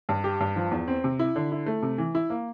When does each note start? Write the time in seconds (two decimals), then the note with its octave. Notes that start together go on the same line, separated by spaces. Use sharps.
0.09 G2
0.24 G4
0.40 G2
0.56 F3
0.71 E2
0.88 C4
1.04 C3
1.19 E4
1.36 D3
1.52 E4
1.66 A3
1.83 C3
1.98 E3
2.15 E4
2.30 A#3